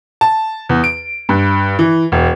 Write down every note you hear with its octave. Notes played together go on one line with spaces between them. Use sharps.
A5
E2
D7
G2
E3
E1